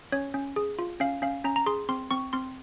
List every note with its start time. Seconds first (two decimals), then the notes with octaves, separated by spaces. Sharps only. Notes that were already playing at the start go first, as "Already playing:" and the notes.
0.12 C#4 C#5
0.34 C#4
0.56 G#4
0.79 F4
1.00 C#4 F5
1.22 C#4 F5
1.44 C#4 A#5
1.56 A#5
1.66 G#4 C6
1.89 C4 C6
2.11 C4 C#6
2.33 C4 C6